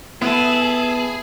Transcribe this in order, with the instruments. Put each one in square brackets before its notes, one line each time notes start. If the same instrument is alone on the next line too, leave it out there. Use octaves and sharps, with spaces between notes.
[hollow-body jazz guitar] B3 [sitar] E4 [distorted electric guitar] G#4 [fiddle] A4